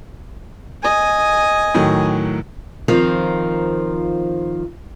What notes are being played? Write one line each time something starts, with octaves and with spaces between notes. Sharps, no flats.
D#5 G#5
A2 D#3 F#3
D#3 F3 C4 F4 A#4